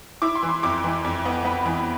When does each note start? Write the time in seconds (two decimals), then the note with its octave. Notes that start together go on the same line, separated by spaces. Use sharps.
0.22 E4 D6
0.35 C6
0.42 E3
0.49 C6
0.63 F2 D6
0.84 E3
1.04 F2
1.25 B3
1.45 B3 B5
1.66 E3